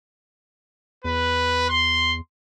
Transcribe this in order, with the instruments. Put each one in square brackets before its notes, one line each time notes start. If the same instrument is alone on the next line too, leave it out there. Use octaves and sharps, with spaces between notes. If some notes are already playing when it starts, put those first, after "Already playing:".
[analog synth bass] E2 [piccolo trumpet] B4
[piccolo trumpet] C6